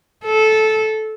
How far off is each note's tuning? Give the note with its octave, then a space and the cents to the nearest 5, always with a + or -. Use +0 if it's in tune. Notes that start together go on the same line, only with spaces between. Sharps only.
A4 -15